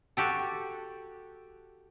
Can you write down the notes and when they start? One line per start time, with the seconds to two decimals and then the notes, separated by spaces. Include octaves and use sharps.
0.17 F#4 G4 A4